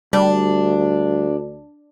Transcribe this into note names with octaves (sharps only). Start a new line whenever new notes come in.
D2 G3 D4